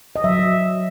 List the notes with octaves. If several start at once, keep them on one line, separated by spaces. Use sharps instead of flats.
D#5
F#3 E5
F#3